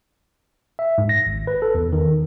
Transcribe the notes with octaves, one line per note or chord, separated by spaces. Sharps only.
E5
G#2
A#6
G#1
B4
A4
E2
D#3